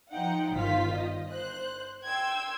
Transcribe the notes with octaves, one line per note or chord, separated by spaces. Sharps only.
F3 D#4 F#5 G5
G1 D#3 F4 C5 F5 B6
D#5
C5 F#6
G5 C6 E6 G#6